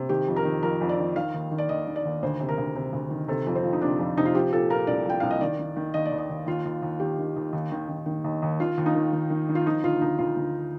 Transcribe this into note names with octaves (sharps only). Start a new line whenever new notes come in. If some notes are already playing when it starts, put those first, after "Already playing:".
Already playing: C3
D#3 G4
F2
A#4
D#3
F2 A#4
F2
D5
D#3
D#3 F5
D#2
D#3
D5
D#2 D#5
D#3
D5
D#2
D2 C5
C3
A#4
D2
C3
D2
D#3
C3 A4
F2
C4
F3
D#4
C3 D4
F2
C3 D#4
F4
F3 G4
A#2 A4
A#2 A#4
C2 D5
F3 G5
C2 F5
D#5
D#3 D5
D#3
D#3
D#2 D#5
D5
D#2
D#5
D#2
D#2 F4
D#2
D#2
D#3 G4
D#3
D#2
D#2
D#3
D#3
D#3
D#2
D#2
D#3 F4
D#2
D#4
D#3
D#3
D#3
D#3
F4
F3 D#4
D2 F4
D2 D#4
D2 F4
D2